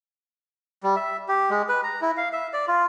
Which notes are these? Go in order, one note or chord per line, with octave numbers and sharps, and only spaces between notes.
G3
E5
G4
G#3
B4
A#5
E4
F5
E5
D5
F4